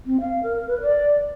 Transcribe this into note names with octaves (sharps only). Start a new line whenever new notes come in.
C4
F5
A#4
B4
D5